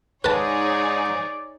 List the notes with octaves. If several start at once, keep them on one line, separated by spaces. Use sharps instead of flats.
G#2 D#4 G#4 B4 C#5 D5 A5